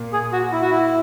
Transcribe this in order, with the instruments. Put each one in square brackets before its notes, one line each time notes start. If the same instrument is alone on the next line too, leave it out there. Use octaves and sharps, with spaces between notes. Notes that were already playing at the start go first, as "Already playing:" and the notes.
Already playing: [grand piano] A#2 A#3
[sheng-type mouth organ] G#4
F#4
E4
F#4
E4